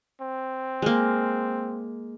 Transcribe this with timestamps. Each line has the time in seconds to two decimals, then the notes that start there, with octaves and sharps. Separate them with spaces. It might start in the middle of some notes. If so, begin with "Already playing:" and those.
0.21 C4
0.82 G#3 A#3